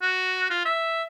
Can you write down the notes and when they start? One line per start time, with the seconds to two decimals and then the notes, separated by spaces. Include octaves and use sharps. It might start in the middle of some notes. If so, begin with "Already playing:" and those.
0.02 F#4
0.50 F4
0.66 E5